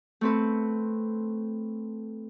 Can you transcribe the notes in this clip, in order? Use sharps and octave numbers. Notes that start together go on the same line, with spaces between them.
A3 C4 B4